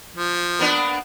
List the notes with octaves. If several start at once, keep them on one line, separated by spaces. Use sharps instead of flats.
F3
A#3 B3 D4